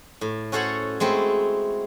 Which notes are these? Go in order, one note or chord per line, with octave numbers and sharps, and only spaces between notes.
A2
C#4 F#4 A4 C5 C#5 F#5
G#3 A3 C4 E4